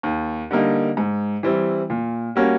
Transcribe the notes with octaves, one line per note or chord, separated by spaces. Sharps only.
D#2
D3 G3 A#3 D#4
G#2
E3 G3 C4 E4
A#2
G3 A#3 C#4 F#4